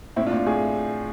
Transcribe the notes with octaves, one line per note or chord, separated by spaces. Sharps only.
A2 C4 E4
D4 F4
A2
A2 G#4